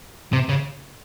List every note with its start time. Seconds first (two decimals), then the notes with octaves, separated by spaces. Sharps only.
0.33 C3
0.49 C#3